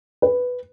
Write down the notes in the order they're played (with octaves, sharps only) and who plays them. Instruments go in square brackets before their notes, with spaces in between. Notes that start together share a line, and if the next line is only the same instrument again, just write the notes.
[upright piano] B4